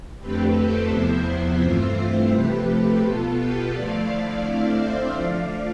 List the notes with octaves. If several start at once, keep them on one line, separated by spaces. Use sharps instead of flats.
F2 D3 A3 C4 G4 B4
A4 C5
E2 C3 F3 B3 E4 C5 E5
G2 E3 A3 C4 F4
C3 F3 A3 G4 B4
B2 B3 F4 A4
G4 B4
D3 F3 A3 E4 D5 F5
D5 F5
D3 A3 C4 E4
C5 E5
D3 F3 A3 D5 F5